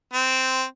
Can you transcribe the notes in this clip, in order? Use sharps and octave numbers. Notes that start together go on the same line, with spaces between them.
C4